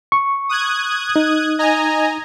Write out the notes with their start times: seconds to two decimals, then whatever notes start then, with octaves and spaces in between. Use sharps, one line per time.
0.12 C#6
0.49 D#6 F#6 G#6
1.16 D#4
1.59 D#5 G#5 A#5